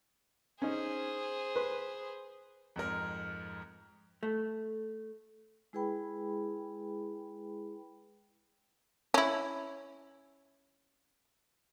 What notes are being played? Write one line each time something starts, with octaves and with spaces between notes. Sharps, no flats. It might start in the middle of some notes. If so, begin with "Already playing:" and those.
C#4 D#4 G#4 C5
B4 C6
F2 G#2 A#4
A3
G#3 E4 G#4 B4 G5 B5
C#4 E4